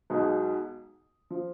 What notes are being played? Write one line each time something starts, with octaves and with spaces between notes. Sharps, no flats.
B1 B2 G#3 D#4
F3